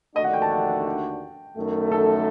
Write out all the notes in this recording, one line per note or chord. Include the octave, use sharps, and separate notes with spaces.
D#2 D3 A3 D4 F#4 D#5
F#5
G5
A5
G5
F#2 D#3 A3
A4